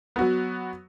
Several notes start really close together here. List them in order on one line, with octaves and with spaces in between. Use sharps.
B3 F#4 F#3